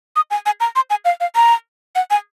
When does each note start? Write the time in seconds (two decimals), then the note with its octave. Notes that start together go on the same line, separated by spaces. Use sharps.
0.16 D#6
0.31 G#5
0.46 G#5
0.60 A#5
0.76 C6
0.90 G#5
1.05 F5
1.20 F5
1.35 A#5
1.95 F#5
2.11 G#5